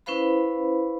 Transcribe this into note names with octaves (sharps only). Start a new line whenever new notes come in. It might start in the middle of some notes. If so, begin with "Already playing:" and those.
C#4 E4 B4 C5 F5 B5